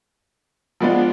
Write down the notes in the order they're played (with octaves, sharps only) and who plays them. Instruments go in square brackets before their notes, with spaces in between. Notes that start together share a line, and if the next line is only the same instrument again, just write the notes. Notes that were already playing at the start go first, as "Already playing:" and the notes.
[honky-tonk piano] F3 G#3 B3 D4 F4